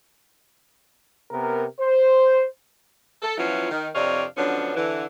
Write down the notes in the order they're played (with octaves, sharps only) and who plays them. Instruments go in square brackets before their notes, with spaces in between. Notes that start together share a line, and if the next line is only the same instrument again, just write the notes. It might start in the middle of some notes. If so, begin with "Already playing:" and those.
[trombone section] C3 B3 A#4
C5
[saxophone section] A4
F3 F#3 B3 C#4 E4 F4
D#3
F2 C3 D4 C#5 D#5 F5
D3 F3 F#3 B3 C#4 D4
D3 E3